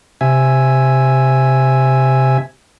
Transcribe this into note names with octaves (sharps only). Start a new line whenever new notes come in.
C3 E5 G#5